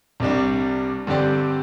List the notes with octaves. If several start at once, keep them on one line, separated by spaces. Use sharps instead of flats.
C2 C3 G3 D4
G2 D3 C4 G4 D5